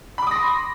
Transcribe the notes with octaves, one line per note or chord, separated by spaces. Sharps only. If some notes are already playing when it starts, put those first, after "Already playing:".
B5 C6 D6 D#6 A#6